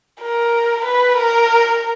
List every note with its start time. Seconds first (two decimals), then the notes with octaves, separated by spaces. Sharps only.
0.21 A#4
0.85 B4
1.17 A#4